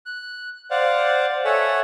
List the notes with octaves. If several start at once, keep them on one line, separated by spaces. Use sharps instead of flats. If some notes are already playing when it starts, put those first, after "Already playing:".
F#6
C5 D5 F5 F#5
A4 C#5 E5 F#5 G#5 E6